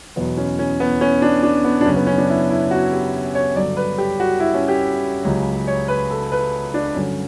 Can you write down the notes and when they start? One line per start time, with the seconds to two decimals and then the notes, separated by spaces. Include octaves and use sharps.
0.16 E2 B2 F#3 B3
0.38 C#4
0.59 C#4
0.80 B3
1.01 C#4
1.22 D4
1.43 D4
1.64 B3
1.81 D4
1.85 F#2 C#3 F#3 C#4
1.96 B3
2.07 C#4
2.18 D4
2.29 E4
2.50 E4
2.71 F#4
2.93 G4
3.35 C#5
3.56 G2 D3 F#3 D5
3.77 B4
3.98 G4
4.20 F#4
4.40 E4
4.54 C#4
4.68 G4
5.25 C#2 C#3 F#3
5.67 C#5
5.88 B4
6.11 A4
6.32 B4
6.74 D4
6.95 G2 D3 F#3 C#4